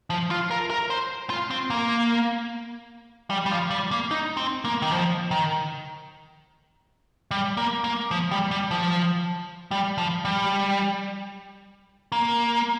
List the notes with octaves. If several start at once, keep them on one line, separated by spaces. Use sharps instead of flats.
F3
F4
A#4
A#4
C5
F4
C4
A#3
G3
G3
F3
G3
A#3
D#4
C4
A#3
D#3
F3
D#3
G3
A#3
A#3
F3
G3
G3
F3
G3
F3
G3
A#3